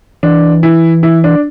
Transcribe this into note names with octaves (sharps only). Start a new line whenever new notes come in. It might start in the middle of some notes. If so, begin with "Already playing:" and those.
E3 D4
E4
E4
D4